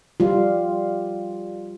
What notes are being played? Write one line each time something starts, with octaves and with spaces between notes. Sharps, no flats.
G3 F4